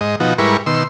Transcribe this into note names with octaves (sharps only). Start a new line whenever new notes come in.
G#2 D#5
B2 F3 D#4 F#4
G#2 G3 E4 A#4 B4 C#6
B2 D#3 C6 E6